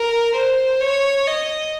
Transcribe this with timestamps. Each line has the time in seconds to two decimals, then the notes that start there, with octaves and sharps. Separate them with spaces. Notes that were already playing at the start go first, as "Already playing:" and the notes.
Already playing: A#4
0.34 C5
0.80 C#5
1.27 D#5